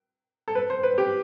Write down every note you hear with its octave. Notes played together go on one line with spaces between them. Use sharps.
A4
B4
C5
B4
G4